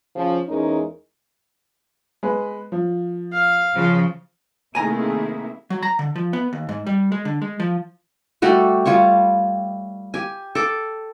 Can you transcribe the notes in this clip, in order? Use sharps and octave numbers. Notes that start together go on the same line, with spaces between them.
C#3 F3
E2 G#3 C#4 D#4 A#4
G#3 B4
F3
F5
C#3 F3
C3 D#3 A3 A#3 E4 G#4 G#5 A#5
F#3
A#5
D3
F3
B3
D#2
G#2
G3
G#3
D3
G#3
F3
G3 A3 F#4 G4
G3 F4 C#5 C#6
G4 G#5
A4 D6